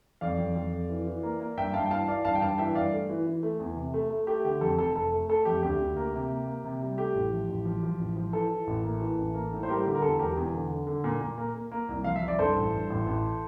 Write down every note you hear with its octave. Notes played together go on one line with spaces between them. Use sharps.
F2 D5 F5
F2
F2
F2
E3
E3
A#3
A#3
G2 E5 G5
G2 F5 A5
G5
E3 F5 A5
E3 D5 F5
G2 F5 A5
G5
G2 F5 A5
E3 E5 G5
G2 D5 F5
A3
E3
E3
A3
E2
C3
A3
A3
A3 G4
D3 G4
F2 A4
F1 A4
F1 A4
A3
A3 A4
F2 G4
D2 G4
D2
A#3
C3
A#3
A#3
C3
G3
A3 G4
A1
F3
A1
F3
F3
A1
F3
E3 A4
E3
A1
A#3
E3
A1
A#3
A2
C5
G3 G4 A#4
D3 G4
A#4
E2 A4
E1 G4 A#4
E2
D3
D3
D3
A#2
A#2
A#3
A#3
A#3
C2
F3 F5
E5
C2
D5
G2 A4 C5
A1
G2
A1
A1